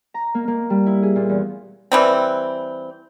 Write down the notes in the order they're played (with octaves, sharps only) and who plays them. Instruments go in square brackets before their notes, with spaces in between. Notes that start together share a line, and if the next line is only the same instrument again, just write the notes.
[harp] A#5
A#3
A#3
G3
E4
G#4
A#2
E2
[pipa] E3 G3 C4